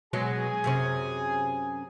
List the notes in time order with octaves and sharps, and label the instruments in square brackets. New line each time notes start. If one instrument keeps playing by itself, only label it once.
[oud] B2 F#3 G#3 [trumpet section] G#4 G#5
[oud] F#2 C3 C#4